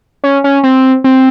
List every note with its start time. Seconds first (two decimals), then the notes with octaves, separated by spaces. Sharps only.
0.24 C#4
0.44 C#4
0.64 C4
1.04 C4